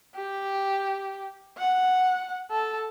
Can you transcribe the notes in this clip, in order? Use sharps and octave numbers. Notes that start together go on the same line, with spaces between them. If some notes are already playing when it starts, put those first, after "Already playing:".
G4
F#5
A4